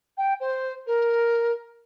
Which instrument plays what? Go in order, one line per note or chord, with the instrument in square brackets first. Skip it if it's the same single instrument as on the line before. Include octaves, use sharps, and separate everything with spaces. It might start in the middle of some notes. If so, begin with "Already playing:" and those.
[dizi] G5
C5
A#4